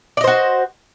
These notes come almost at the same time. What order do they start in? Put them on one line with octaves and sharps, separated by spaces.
D5 D#5 C5 F#4